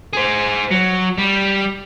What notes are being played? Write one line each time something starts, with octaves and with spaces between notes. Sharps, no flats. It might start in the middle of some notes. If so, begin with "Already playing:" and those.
G#4 C5
F#3
G3